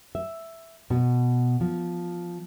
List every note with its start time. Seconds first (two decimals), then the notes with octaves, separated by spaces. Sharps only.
0.15 E5
0.90 B2
1.61 F3